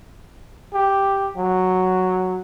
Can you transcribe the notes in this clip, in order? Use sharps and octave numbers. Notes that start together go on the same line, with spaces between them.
G4
F#3